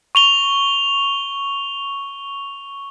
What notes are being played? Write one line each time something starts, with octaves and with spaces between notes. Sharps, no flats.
C#6 F7 G7